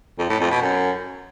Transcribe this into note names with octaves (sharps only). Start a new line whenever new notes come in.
F2
A2
F2
B2
F#2